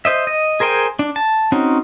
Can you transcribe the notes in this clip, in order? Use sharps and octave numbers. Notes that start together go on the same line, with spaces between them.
C5 D#5 E5
D#5
G#4 A#4 C5 G5 G#5
D4
A5
C4 C#4 D#4 F#4